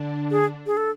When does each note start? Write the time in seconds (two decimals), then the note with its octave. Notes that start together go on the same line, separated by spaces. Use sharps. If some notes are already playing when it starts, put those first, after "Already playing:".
Already playing: D3 D4
0.31 G#4
0.67 G#4
0.77 A4